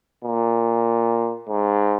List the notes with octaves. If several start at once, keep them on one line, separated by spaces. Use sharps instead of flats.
A#2
G#2